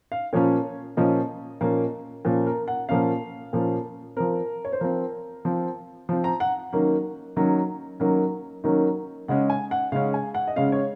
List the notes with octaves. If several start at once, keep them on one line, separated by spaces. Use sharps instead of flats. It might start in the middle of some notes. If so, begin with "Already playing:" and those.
F5
A#2 F3 A#3 C#4 C#5
A#2 F3 A#3 C#4 D#5
A#2 F3 A#3 C#4
A#2 F3 A#3 C#4
A#4
F#5
A#2 F3 A#3 C#4 F5
A#2 F3 A#3 C#4
F3 C4 A#4
C#5
C5
F3 C4 A#4
F3 C4
F3 C4
A#5
F#5
D#3 F#3 A#3 C#4
D#3 F#3 A#3 C#4
D#3 F#3 A#3 C#4
D#3 F#3 A#3 C#4
C#3 G#3 C#4 F#5
G#5
F#5
C#3 G#3 C#4 F5
G#5
F#5
D#5
C#3 G#3 C#4 F5
C#5